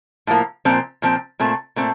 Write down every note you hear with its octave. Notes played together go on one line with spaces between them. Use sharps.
A2 F3 A#3
A#2 F3 C4
A#2 F3 C4
A#2 A3 C4
A#2 A3 C4